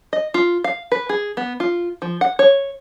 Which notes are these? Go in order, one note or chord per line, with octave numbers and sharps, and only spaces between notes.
D#5
F4
F5
B4
G#4
B3
F4
F3
F#5
C#5